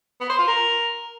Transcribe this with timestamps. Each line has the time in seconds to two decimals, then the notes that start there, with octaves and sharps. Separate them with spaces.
0.20 B3
0.29 C5
0.39 F4
0.48 A#4